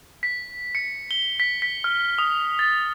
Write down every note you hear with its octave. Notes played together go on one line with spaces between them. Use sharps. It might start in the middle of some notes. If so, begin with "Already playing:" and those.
B6
C#7
G7
B6
B6
F6
D#6
A6